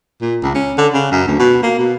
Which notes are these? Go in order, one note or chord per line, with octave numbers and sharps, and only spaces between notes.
A#2
C#2
C#4
D3
C#3
F#2
D2
B2
A#3
B2